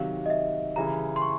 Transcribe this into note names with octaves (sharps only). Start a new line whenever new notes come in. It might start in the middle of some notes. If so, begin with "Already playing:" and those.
Already playing: C3 D#3 F#3 F5
D#5
E5
C#3 E3 G3 A#5
C6
C#6